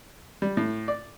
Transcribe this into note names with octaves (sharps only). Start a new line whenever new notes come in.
G3
A2
D5